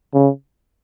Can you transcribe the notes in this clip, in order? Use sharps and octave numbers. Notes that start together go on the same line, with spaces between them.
C#3